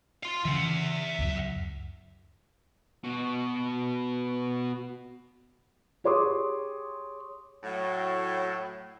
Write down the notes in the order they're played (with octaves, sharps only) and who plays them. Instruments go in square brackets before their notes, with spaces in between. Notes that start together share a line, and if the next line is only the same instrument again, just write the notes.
[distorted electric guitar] F5 C6
[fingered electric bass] C#3 E3 [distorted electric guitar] E5 F#5
[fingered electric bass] C#2 F#2
[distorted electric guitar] B2 F#4
[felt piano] G4 G#4 C#5 C6 D6 D#6
[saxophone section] A2 F#3